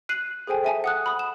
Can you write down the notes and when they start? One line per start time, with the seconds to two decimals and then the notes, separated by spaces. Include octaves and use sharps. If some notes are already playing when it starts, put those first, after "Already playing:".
0.09 F#6 C7 D#7 F#7
0.47 G#4 A4 C5 G5 G#5
0.64 E5 G#5 A5
0.84 F#5 D#6 F#6
1.06 B5 D#6
1.19 E7